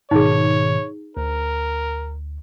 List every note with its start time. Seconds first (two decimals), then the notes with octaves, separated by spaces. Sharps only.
0.11 G#2 B2 D#3 D#4 G#4 C#5
1.17 D2 A#4